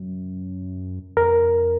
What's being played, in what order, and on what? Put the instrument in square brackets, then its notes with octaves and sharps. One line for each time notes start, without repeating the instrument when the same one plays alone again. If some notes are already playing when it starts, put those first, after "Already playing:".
Already playing: [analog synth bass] F#2
[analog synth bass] F2 [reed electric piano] A#4